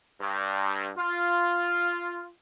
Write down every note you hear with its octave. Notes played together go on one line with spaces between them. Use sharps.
G2
F4